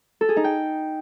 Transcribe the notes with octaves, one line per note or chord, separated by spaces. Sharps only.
A4
G#4
D#4
G5